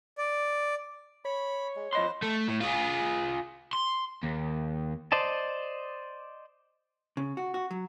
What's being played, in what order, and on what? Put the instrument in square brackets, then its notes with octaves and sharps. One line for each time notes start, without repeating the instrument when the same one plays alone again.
[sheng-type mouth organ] D5
[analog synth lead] C#5 [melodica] B5
[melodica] G#3
[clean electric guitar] F2 D#5 C6 [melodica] B4 C5
[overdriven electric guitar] A3
A2
F4 G#4
C6
D#2
[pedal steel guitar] C5 D5 D#5 A5
[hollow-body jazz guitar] C#3
F#4
F#4
F#3